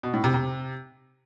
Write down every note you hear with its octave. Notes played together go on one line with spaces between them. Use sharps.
B2
A2
C3
C3